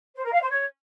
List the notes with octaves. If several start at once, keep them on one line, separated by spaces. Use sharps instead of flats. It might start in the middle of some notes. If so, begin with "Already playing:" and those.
C5
A#4
F5
C5
C#5